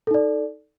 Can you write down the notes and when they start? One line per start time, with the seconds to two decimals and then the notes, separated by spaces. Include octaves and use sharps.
0.07 A4
0.11 D#4
0.14 D5